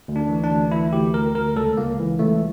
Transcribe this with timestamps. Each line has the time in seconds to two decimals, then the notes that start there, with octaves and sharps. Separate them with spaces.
0.08 D2
0.16 D4
0.29 E3
0.44 D4
0.51 D2
0.71 E3 E4
0.93 D2 G4
1.14 D2 A#4
1.35 D2 A#4
1.56 C#2 A4
1.77 C#2 A#3
1.99 E3
2.19 C#2 A3